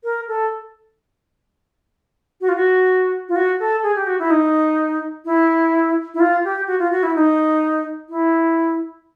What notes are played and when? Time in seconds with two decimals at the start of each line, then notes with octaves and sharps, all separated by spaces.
0.04 A#4
0.28 A4
2.41 F#4
2.49 F4
2.56 F#4
3.29 F4
3.36 F#4
3.60 A4
3.83 G#4
3.96 G4
4.07 F#4
4.19 E4
4.30 D#4
5.25 E4
6.14 E4
6.20 F4
6.45 G4
6.67 F#4
6.79 F4
6.92 F#4
7.03 E4
7.15 D#4
8.09 E4